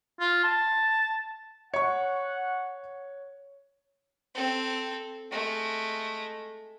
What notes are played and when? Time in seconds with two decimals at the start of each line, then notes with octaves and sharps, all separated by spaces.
0.20 F4
0.44 A5
1.74 C#5 F#5 C#6 C#7
4.35 C4 A4
5.31 G#3 A3